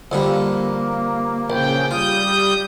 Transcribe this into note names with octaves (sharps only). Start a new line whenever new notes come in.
F2 D3 G3 A#3
A#1 C#3 G5
G3 F4 D#6 G6